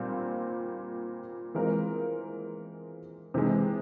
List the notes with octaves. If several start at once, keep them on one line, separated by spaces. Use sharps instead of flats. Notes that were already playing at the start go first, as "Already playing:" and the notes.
Already playing: A#2 G3 C4
E3 G#3 C4 F4 A#4
C3 E3 G#3